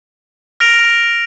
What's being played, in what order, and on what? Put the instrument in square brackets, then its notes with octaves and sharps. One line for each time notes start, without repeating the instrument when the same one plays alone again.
[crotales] F6 A#6 D7 F7